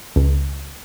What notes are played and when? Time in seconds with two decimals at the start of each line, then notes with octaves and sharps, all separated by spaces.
0.16 C#2